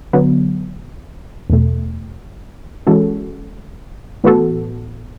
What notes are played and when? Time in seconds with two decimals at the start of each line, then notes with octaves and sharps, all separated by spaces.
0.13 D3 F#3 B3
1.50 E2 B2 A3
2.87 E3 G#3 C#4 F#4 A4
4.24 A2 E3 B3 F#4 A4